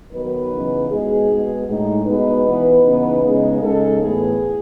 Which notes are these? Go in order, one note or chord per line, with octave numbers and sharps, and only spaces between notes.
D#3 F#3 B3 D#4 B4
C#3 E3 B3 D#4
B2 G#3 D#4 G#4
B2 G#3 B3
A2 G#3 D#4
B2 G#3 B3 D#4 B4
E3 B3 D#4
C#3 E3 B3 D#4
C#3 G#3 B3 D#4
C#3 G#3 D#4 A4
A2 E3 B3 G#4